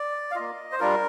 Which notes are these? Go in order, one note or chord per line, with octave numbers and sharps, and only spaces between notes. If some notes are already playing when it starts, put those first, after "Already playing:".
Already playing: D5
F5
A#3 F4 D#5
C5
G3 D4 F4 A#4